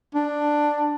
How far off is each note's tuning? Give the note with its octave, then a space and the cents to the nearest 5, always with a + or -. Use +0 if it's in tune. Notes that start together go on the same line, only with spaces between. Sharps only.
D4 +5